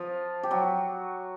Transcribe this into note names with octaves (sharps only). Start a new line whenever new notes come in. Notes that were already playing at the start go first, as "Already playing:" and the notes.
Already playing: F3 F4
G4
F#3 F#4